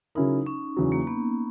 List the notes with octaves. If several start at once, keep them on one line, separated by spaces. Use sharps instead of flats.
C#3 F#3 C#4 D#4 E4 A#4
C#4
E2 C#3 F#3
A#3
B3